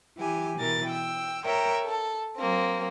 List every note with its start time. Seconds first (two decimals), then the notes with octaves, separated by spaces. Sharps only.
0.18 E3 G4 G#5
0.57 B2 E3 A#4 A6
0.86 G5 E6
1.44 A#4 C#5 E5 G5 A#5
1.85 A4
2.37 F#3 A#3 C4